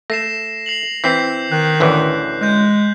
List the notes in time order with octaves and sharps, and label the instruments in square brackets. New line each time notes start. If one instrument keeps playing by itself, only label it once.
[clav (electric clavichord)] A3 [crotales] A#6 C7 E7
[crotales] C7 F7 F#7
[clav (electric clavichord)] E3 C4 [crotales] G6 B6 C7
[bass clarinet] D#3 [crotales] F#6
[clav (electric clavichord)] A1 D2 E3
[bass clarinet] G#3 [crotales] F#6 G6